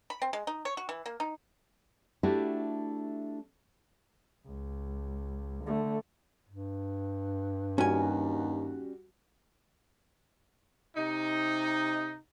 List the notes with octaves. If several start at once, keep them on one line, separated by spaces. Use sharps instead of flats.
B5
C4
G#3
D#4
C#5
F#4
E3
A#3
D#4
A3 D4 E4 F#4 G4
C#2
D3 A3
G2
D#2 G3 C#4 F#4 G#5
C3 D#4